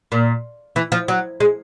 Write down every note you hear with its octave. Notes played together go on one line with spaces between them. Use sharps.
A#2
E3
F3
F#3
G#3